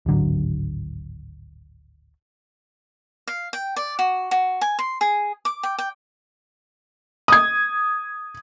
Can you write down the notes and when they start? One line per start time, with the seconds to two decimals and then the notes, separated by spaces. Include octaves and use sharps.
0.06 D1 G#1 D3 F#3
3.28 F5
3.53 G5
3.76 D5
3.99 F#4
4.31 F#4
4.61 G#5
4.79 C6
5.01 G#4
5.45 D6
5.63 G5
5.78 G5
7.28 D#6 G#6